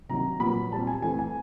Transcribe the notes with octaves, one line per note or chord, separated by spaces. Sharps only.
C3 D#3 F#3 A#5
A#2 F#3 B3 B5
A#2 G3 C4 A5
G#5
E3 A3 C4 G#5
G#5